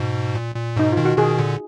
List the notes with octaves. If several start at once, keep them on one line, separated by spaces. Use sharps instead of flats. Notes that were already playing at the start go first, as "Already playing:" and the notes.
Already playing: G#2 B2
A#2
A#2
G#2 B2 D#4
F4
B2 D#3
F#4
B2 D#3 G#4
A#2 D3